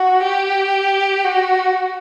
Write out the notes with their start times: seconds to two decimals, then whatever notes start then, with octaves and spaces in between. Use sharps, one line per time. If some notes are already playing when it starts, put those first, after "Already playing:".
Already playing: F#4
0.23 G4
1.24 F#4